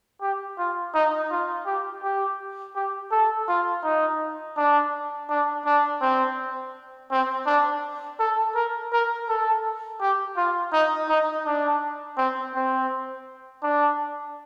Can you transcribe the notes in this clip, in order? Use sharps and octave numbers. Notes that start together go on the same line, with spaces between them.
G4
F4
D#4
F4
G4
G4
G4
A4
F4
D#4
D4
D4
D4
C4
C4
D4
A4
A#4
A#4
A4
G4
F4
D#4
D#4
D4
C4
C4
D4